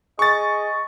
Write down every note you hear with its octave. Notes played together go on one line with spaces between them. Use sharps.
G#4 D#5 C#6 A6